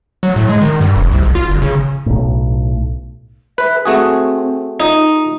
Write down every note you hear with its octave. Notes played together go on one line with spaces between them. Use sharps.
F#3
A2
G#3
D#3
G2
F1
C2
G#1
F4
G1
C#3
B1 A2
B4 E5
A3 C4 F#4 G#4
D#4 F4
F4